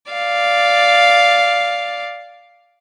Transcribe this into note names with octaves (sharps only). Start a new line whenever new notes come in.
D5 F5